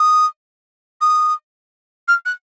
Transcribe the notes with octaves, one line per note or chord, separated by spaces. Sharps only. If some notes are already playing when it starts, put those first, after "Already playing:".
Already playing: D#6
D#6
F6
F#6